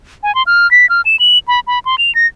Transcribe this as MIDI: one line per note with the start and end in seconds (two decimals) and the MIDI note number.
0.23 0.34 80
0.35 0.43 84
0.47 0.70 89
0.71 0.89 95
0.89 1.01 89
1.05 1.16 100
1.20 1.39 102
1.48 1.60 83
1.67 1.79 83
1.85 1.96 84
1.98 2.14 101
2.15 2.26 94